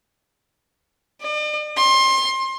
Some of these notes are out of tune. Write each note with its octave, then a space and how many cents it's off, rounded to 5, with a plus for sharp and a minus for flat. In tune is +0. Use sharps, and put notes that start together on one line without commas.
D5 +45
C6 +25